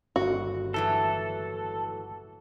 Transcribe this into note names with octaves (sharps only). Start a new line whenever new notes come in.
G1 D#2 F#4
A2 E3 F#3 A4